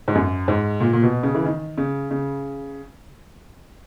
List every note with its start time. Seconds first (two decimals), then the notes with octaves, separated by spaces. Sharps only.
0.08 G#2
0.15 F#2
0.48 G#2
0.80 A#2
0.93 A#2
1.03 B2
1.23 C#3
1.35 E3
1.46 D#3
1.78 C#3
2.11 C#3